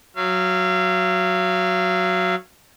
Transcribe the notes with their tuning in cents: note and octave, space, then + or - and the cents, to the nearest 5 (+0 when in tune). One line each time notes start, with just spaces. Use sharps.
F#3 -5 F5 -35